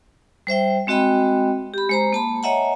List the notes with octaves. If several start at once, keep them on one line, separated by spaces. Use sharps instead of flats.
G3 C5 E5 G5
G#3 C4 F#4 D#5 G5 B5
G4 B5
G#3 C5 A#5
A#3 A5 B5
C#5 D#5 E5 F#5 G#5 A#5